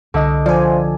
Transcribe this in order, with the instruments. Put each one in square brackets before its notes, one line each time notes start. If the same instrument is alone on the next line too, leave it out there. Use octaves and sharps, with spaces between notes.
[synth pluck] C2 D#5 [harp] D3
[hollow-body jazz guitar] F3 [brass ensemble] F4 C5 [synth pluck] D5 G#5